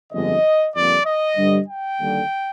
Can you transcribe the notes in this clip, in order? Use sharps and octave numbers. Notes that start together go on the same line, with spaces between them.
G1 F2 D3 G#3 D#5
F2 D3 G3 A#3 D5
D#5
G2 D3 G3
G5
D#2 D3 G3